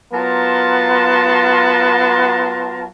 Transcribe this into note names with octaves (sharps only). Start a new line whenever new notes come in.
F#3 B3 F4 A#4 A5 C6